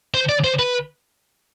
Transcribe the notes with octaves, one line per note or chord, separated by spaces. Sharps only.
C5
D5
C5
B4